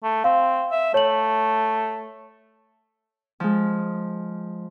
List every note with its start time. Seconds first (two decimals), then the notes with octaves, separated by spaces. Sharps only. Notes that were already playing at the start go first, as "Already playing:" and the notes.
0.04 A3
0.24 C4 F5
0.71 E5
0.94 A3 C#5 F#7
3.40 F3 G#3